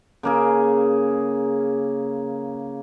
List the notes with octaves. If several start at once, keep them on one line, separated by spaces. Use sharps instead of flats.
C#3 A#3 G#4